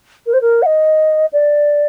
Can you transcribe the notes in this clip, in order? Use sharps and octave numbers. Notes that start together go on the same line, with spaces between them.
A#4
C5
A#4
F#5
D#5
D5